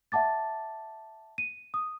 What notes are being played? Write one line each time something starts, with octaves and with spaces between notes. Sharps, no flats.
E5 F#5 A5 D6 A6
D#7
D#6